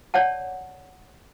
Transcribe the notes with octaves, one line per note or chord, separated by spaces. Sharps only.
C#5 D5 F#5 A5